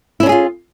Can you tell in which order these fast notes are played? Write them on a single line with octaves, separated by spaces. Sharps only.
E4 C#4 D4 G#4 F4